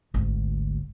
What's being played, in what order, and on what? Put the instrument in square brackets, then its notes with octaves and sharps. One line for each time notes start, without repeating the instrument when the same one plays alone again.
[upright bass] G#1 D2